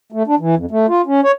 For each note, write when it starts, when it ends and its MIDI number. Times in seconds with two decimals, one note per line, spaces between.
0.12 0.23 57
0.27 0.35 62
0.39 0.55 52
0.57 0.66 41
0.71 0.86 57
0.88 1.02 65
1.06 1.21 61
1.23 1.32 73